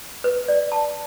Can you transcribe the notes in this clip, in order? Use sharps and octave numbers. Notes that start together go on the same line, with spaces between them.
B4
D5
A5